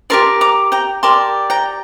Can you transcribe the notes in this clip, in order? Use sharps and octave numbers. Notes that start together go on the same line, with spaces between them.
G4 A#4 D5 A5 C6
A#5 D6
G5 A#5
G4 A#4 D5 A5 C6
G5 A#5